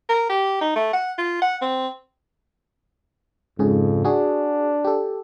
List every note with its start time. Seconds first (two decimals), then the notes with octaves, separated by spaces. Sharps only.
0.09 A#4
0.29 G4
0.61 D#4
0.76 A3
0.93 F#5
1.18 F4
1.42 F#5
1.62 C4
3.59 F2 G#2 C#3 G#4
4.05 D4 F#4 G#4
4.85 G4 A4